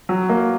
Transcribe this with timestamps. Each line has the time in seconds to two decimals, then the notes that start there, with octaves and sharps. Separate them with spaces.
0.09 F#3
0.29 A#3